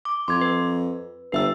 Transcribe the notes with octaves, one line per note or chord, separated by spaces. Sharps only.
D6
F2 C6 D6 G#6
B4
G1 B4 E5 E6